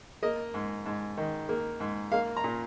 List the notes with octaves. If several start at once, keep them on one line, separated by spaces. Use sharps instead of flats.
A#3 D#5
G#2
G#2
D#3
A#3
G#2
A#3 F5
A#5
A#2